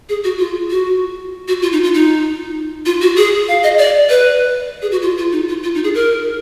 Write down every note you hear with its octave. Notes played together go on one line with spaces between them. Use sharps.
G#4
F#4
F4
F#4
F#4
F4
D#4
F4
D#4
F4
F#4
G#4
F5
D#5
D5
B4
G#4
F#4
F4
F4
D#4
F4
F4
D#4
G#4
A#4